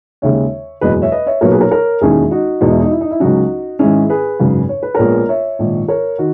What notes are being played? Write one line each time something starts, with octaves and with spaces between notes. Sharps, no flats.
D#2 C#3 G#3 C#5 E5
F#1 E2 B2 G#3 B4 D#5
C#5 E5
B4 D#5
C#5 E5
B1 A#2 F#3 B3 A#4 C#5
G#4 B4
A#4 C#5
A#4 C#5
E1 D#2 D#3 G#3 C#4 E4 G#4
D#4 F#4
E1 E2 B2 G#3 D#4
E4
D#4 F#4
E4
D#4
E4
C#2 C#3 F#3 C#4 D#4 F#4
G#2 D#3 G#3 C#4 E4 G#4
G#4 B4
G#1 F#2 C#3
C#5
B4
A#1 A#2 G#3 B3 A#4 C#5
C#5 E5
A#1 G#2 D#3
A#4 C#5
D#3 F#4